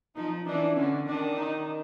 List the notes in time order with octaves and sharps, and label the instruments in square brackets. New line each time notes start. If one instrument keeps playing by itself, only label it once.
[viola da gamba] F3 [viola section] D#4
[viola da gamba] E3 [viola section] D4
[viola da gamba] D3 [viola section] C#4
[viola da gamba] D#3 [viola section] D4
[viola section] D#4